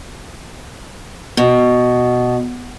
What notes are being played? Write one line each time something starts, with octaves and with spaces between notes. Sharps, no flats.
B2